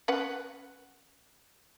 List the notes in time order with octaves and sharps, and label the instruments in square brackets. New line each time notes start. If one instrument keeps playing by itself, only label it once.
[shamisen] C#4 B4 F#5